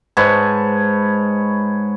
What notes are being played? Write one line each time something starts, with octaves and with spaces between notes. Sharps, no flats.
G#2 B4 C#5 A5